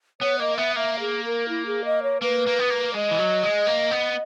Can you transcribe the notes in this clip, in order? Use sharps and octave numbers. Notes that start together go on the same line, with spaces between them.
B3 C#5
A#3 D#5
B3 E5
A#3 E5
G#4
A#4
E4
G#4
D#5
C#5
A#3 B4
A#3
B3
A#3
G#3 D#5
E3
F#3
G#3
A#3
B3